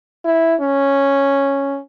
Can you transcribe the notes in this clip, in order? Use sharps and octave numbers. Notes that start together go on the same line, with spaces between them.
E4
C#4